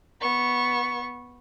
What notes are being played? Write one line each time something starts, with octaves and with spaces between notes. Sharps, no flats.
B3 C#6